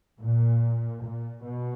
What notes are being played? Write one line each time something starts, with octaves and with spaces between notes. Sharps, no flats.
A#2
A#2
B2